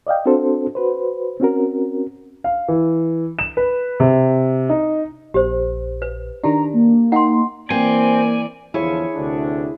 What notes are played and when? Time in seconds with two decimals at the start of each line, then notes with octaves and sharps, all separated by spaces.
0.07 D5 D#5 F5 G5
0.26 C4 D4 F#4 A4 C5
0.75 F#4 B4 C5
1.40 C4 C#4 F#4 A#4
2.44 F5
2.68 E3
3.39 E7
3.57 B4
4.00 C3
4.69 D#4
5.34 A#1 G4 C5
6.02 B4
6.44 D#3 D4 G4 A5 A#5
6.73 A#3
7.12 D#4 F#5 G5 C6
7.70 E3 A#3 C4 D5 G#5
8.74 E2 D3 F3 E4 G#4 C#5
9.14 D2 C3 D4